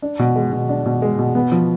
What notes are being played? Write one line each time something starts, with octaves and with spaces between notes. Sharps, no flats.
D4
B2
G#3
B2
D4
B2
G#3
B2
B3
F3